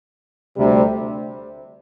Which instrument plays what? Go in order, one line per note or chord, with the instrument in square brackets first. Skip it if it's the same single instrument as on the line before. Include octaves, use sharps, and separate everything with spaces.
[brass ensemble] D2 C3 G3